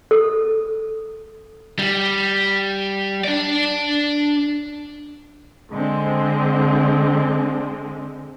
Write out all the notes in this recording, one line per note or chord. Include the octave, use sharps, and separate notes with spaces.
A4
G3
D4 D5
D3 G#3 C4